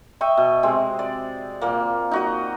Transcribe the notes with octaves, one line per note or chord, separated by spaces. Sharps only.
D#5 E5 G5 C#6
B2
C3 G#3 C4
D5
A#2 A#3
D#4 F#4 D#5